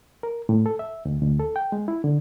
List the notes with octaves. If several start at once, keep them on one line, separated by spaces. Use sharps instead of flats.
A#4
A2
A4
E5
D2
D2
A4
G5
G#3
E4
D3